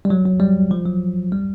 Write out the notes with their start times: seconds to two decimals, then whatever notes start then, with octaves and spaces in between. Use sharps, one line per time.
0.05 G3
0.10 F#3
0.26 F#3
0.40 G3
0.71 F3
0.86 F#3
1.32 G3